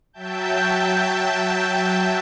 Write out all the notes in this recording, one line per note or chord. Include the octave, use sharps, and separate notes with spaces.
F#3 E5 G5 A5 G6